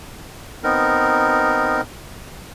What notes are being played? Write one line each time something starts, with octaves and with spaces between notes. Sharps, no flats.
B3 C4 D#4 A#4